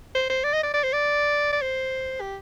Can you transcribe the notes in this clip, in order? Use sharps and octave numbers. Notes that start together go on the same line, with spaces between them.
C5
C5
D5
D#5
D5
D5
C5
D5
D5
C5
G4